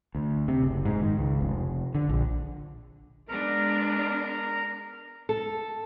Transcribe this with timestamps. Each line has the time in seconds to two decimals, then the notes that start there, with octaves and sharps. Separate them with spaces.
0.15 D2
0.48 C3
0.63 F#1
0.85 G#2
1.01 D#3
1.18 C#2
1.41 F1
1.95 D3
2.09 A#1
3.29 G#3 B3 D4 A#4 A#5
5.29 A4